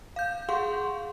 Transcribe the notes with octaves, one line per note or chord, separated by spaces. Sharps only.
F5 G6
G#4 F5 F#5 C6 C#6